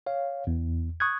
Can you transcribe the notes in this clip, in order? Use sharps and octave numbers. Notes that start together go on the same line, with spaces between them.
C#5 F5
E2
C#6 D#6 F#6 G#6